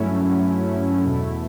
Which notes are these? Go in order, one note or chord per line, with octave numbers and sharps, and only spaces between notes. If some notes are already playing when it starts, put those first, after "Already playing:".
Already playing: G2 F#3 A3 C#4 E4
E2 B2 A3 E4